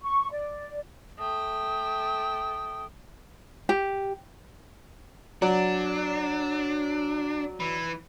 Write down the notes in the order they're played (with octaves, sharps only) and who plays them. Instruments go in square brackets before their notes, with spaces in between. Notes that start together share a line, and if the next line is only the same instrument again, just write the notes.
[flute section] C#6
D5
[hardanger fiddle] A3 G5 [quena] D#6
[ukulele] G4
[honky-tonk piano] F#3 D5 [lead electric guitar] D4
[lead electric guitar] E3